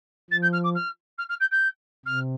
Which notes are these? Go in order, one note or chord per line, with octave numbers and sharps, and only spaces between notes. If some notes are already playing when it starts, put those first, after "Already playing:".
F3 A6
G6
F6
D6
F6
F6
F6
G6
G6
C3 F6